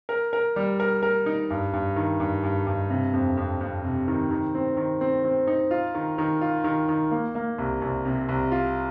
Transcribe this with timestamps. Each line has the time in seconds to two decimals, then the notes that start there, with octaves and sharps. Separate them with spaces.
0.09 A#4
0.33 A#4
0.56 G3
0.80 A#4
1.02 A#4
1.26 D#4
1.50 G2
1.73 G2
1.96 D#3
2.20 G2
2.43 G2
2.67 G2
2.90 C3
3.13 F2
3.37 F2
3.61 F2
3.84 C3
4.08 D#3
4.31 D#3
4.55 C4
4.77 D#3
5.01 C4
5.25 C4
5.47 D#4
5.71 F4
5.95 D#3
6.18 D#3
6.41 F4
6.64 D#3
6.89 D#3
7.11 A#3
7.35 A#3
7.58 C2
7.82 C2
8.05 C3
8.29 C2
8.52 F4